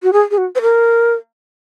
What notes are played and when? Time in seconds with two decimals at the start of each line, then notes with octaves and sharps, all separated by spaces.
0.03 F#4
0.13 G#4
0.31 G#4
0.38 F#4
0.56 C5
0.62 A#4